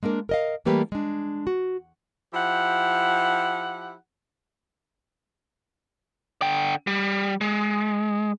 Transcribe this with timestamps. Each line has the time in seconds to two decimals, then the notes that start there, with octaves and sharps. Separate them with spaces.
0.03 G#3 A#3 D4 A#4
0.29 A#4 D#5 F5
0.65 E3 G3 A3 A#3 G4 B4
0.92 G#3 D4
1.47 F#4
2.34 F3 E4 G4 F#5
6.42 D3 G5
6.87 G3
7.41 G#3